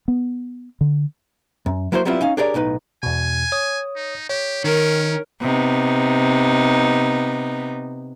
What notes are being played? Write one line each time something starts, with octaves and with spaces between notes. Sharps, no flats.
B3
D3
F#2
F#3 A#3 E4 F#4 A4 C5
F#3 G3 B3 C4 E4 F4
C#4 D#4 F5
D4 G4 G#4 A#4 C#5 D5
B1 A2 D#4 B4
E2 B2 G#5
C#5 D#6
D#4
G4 C#5
D#3 C#4 A#4
C3 B3 D#4